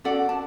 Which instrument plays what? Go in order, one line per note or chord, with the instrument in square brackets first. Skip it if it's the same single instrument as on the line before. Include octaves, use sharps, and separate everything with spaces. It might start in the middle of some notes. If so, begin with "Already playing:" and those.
[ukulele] C#4 F#4 A4 D5 F#5
A5